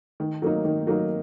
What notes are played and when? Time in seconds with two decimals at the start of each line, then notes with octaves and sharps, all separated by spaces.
0.20 D#3
0.42 F#3 A#3 D#4
0.65 D#3
0.87 F#3 A#3 D#4